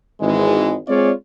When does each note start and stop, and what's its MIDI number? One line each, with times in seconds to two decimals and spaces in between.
0.20 0.75 32
0.20 0.75 52
0.20 0.75 56
0.87 1.12 56
0.87 1.12 60
0.87 1.12 65
0.87 1.12 73
0.87 1.12 74